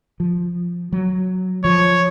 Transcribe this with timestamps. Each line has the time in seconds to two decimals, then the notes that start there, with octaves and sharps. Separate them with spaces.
0.20 F3
0.92 F#3
1.64 F3 C#5